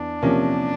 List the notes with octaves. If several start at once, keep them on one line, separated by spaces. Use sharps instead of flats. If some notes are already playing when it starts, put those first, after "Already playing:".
Already playing: E2 D4
C3 F3 A#3 C#4